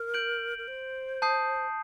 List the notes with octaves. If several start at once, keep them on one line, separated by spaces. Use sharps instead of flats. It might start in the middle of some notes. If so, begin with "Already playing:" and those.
Already playing: A#4
G6 D7 F#7
A#4
C5
A5 D#6 G6 C7